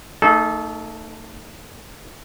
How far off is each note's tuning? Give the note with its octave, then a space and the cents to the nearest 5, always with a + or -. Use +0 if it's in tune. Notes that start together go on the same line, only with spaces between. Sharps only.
A3 +40 D#4 +0 A4 -30